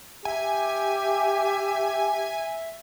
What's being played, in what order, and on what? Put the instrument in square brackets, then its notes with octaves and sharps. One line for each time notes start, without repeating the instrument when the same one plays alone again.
[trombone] G4 [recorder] E5 [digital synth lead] G#5